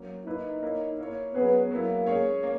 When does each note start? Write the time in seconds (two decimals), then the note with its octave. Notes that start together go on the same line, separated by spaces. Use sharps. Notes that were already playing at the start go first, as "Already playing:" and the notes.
Already playing: F#3 A#3 C#4
0.26 A#3 D#4 E4 B4
0.62 A#3 E4 A#4 C#5
0.98 A#3 E4 A#4 C#5
1.34 F#3 B3 C#4 G#4 B4
1.70 F#3 A#3 B3 E4
2.07 G#3 C#4 G#4 C#5
2.43 A#3 C#4